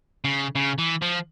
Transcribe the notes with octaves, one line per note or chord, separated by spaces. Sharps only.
C#3
C#3
E3
F3